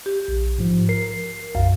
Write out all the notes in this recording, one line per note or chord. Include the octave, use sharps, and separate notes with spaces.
G4
A#1
G#2 F3
A#4 C7
B1 F#2 F5